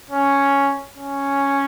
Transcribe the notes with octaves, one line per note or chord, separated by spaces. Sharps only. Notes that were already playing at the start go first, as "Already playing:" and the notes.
C#4
C#4